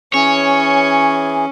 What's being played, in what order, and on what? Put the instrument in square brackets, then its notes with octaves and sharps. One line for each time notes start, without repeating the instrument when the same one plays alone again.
[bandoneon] E3 G#4 [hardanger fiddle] C#4 [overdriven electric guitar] C#5